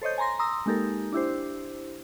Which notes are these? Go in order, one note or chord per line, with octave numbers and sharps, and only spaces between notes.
A4 C5 C#5 D#5 G6
G#5 A#5 C6 A#6
A#5 C6 D#6 E6 A#6
G#3 A#3 D#4 G4 A4 A#4
D4 E4 G4 C5